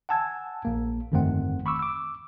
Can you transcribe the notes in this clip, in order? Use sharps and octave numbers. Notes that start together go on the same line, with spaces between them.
F#5 G#5 A5 E6 G#6
A#1 A#3
G1 F2 D#3 A3 C4 F#5
B5 C#6 D6 E6
D6 E6